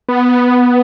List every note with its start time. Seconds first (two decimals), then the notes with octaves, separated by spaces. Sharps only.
0.09 B3